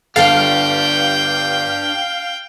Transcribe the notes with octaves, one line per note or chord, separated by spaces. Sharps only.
G1 D4 G4 A4 F5 G5 A6